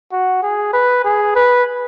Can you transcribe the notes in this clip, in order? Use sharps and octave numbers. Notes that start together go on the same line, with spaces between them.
F#4
G#4
B4
G#4
B4